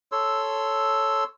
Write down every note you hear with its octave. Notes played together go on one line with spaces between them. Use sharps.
A4 C#5 C6 E6